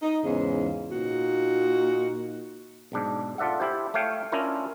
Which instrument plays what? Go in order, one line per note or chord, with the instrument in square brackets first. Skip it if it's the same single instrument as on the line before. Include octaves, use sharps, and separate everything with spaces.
[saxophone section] D#4
E2 G#2 C#3
A#2 D#4 F#4
[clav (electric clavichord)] B1 G#2 D4
F4 A4 D5 E5 F#5
E4 G4 C5
A3 C#5 F5 G5
C#4 D4 E4 F4 A#4